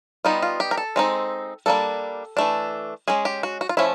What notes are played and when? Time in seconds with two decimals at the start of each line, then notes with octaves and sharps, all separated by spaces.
0.25 G3 B3 D#4 F4
0.42 F4
0.60 G4
0.71 A#4
0.77 A4
0.96 G#3 C4 D#4
1.66 G3 A#3 D4 A4
2.37 E3 A3 D4
3.08 G#3 C#4 G#4
3.25 G4
3.43 F#4
3.61 F#4
3.69 F4
3.77 F3 A3 C#4 E4